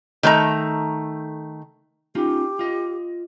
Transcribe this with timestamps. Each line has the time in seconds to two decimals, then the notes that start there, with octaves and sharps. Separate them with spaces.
0.23 D#3 A3 C5 A#5
2.15 C#4 D#4 F4 G4
2.59 F4 D#5